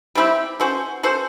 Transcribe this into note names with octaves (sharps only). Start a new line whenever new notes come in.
G3 C4 E4 G4
C#4 F#4 A4 C5
C#4 F#4 A4 C5